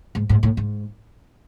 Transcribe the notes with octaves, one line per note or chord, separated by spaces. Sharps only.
G#2
G#2
A2
G#2